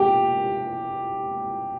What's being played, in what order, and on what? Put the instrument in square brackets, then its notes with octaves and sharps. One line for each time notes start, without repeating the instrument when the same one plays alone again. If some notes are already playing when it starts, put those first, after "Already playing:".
Already playing: [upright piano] G4